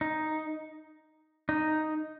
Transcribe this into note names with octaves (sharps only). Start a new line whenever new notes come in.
D#4
D#4